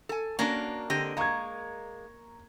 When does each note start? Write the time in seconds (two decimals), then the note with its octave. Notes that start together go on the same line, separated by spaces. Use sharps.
0.09 A4 G#5
0.39 A#3 C#4 D4 F#4
0.90 D3 C4 G4 D#5
1.17 G#3 A#3 A#5 C#6 G#6